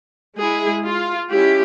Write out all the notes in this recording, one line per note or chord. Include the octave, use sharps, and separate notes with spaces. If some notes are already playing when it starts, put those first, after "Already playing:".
G#3 E4 G#4
F4
G#3 C#4 E4 G4